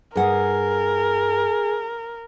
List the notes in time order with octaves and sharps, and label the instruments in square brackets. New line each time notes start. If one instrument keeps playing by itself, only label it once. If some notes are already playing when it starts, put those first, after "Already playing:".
[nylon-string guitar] G2 F#5 [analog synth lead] G#4 [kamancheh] A#4